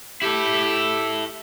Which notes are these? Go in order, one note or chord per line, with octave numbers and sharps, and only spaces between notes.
E4 G4 A4